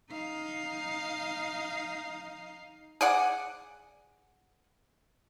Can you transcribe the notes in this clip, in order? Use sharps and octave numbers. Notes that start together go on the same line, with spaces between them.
D#4 F5
G#4 D5 F#5